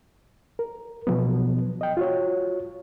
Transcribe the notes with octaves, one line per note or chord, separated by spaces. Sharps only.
A#4
B2 F3 F#3 B3
D#5 G5
F4 F#4 C#5